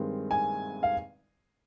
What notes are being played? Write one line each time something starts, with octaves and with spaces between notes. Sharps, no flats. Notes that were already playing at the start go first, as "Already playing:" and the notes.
Already playing: G2 D#3 G#3 C4
G#5
F5